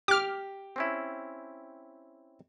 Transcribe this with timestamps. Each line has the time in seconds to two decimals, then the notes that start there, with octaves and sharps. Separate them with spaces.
0.08 G4 D6 F6
0.76 C4 C#4 E4